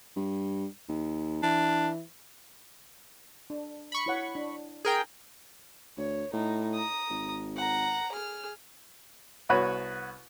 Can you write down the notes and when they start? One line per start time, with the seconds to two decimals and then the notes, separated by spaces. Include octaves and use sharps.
0.16 G2
0.89 D#2
1.43 E3 D4
3.50 D4
3.92 B5 C#6
4.06 E4 C#5 F#5
4.35 D4
4.85 G#4 A#4 G5
5.97 D2 C#5
6.33 A2 D#4
6.75 A#5 D#6
7.10 G#1
7.57 F#5 A#5
8.12 G#4 F6
9.49 C2 B3 F#4 B4 C#5